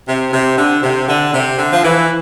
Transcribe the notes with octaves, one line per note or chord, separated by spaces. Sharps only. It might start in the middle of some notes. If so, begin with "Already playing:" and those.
C3
C3
D3
C3
D3
C3
D3
F3
E3